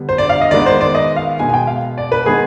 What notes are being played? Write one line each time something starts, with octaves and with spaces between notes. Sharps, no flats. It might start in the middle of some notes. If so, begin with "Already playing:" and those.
Already playing: D3 G3 B3
C5
D5
F5
D#5
D#3 G#3 B3 D5
C5
D5
D#5
F5
B2 G#3 B3 G#5
G#5
G5
F5
D5
B4
D#3 G#3 B3 G#4